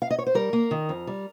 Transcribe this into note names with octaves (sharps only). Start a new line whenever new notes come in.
F5
D#5
C#5
C5
G3 A#4
A#3
D#3
F2
G3